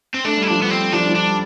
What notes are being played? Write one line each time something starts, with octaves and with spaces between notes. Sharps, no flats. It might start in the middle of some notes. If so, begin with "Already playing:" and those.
C4
A3 D4
G3
E4
F3 D4
G3 B3
C4
F3 D4
G3
F3
D4
G3